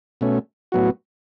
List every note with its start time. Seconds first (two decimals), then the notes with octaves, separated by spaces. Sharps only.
0.21 B2 A3 C#4
0.72 A2 F#3 B3 F#4